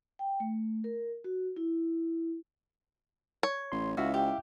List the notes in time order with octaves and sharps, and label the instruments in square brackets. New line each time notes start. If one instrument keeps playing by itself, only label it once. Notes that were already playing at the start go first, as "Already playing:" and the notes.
[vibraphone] G5
A3
A#4
F#4
E4
[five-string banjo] C#5
[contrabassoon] A1 [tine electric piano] C6
[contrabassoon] C#2 [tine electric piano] E4 E5 F5 [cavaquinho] F#4
[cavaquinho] G4